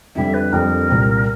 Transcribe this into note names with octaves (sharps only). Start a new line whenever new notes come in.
F2 D3 G3 E5
B4
F2 D3 G3 A#4
C2 A#2 G3